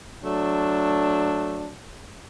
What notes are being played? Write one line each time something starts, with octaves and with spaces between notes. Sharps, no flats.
F#3 A3 D4